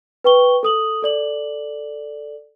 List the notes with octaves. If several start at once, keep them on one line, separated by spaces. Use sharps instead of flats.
B4 G5 C#6 G7
A4 D#6 F#7
A4 D5 F#7